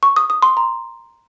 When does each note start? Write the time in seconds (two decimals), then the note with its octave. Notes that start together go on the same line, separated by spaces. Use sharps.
0.03 C#6
0.16 D#6
0.30 D#6
0.42 C6
0.57 A#5